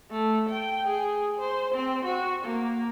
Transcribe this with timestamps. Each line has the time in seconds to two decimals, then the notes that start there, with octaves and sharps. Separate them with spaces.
0.11 A3
0.49 G5
0.88 G#4
1.39 C5
1.74 C4
2.05 F#4
2.45 A#3